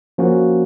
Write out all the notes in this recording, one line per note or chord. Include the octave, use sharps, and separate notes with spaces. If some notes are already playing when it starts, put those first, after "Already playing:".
F3 A#3 C#4 F#4